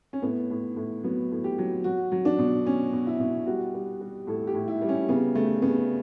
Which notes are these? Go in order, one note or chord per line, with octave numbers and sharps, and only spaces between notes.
C#4
A2 B3
A2
A2
F#3 B3
A2
G4
F#3
F#3 F#4
F#3
D4
B2
B2 C#4
B2
E4
B2
G3 F#4
G3
G3
A2 A4
G4
A2
E4
G3
C#4
C#3 B3
C#3 A3
C#3 B3